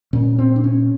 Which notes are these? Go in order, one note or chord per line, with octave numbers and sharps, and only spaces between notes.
A#2 C#4
C4
D4
C#4